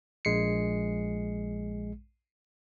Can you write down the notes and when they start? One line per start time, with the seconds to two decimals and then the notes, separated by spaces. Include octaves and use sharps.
0.25 A#1 G#3 C7 C#7